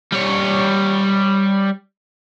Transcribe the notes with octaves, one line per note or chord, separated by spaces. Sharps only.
G3 C#5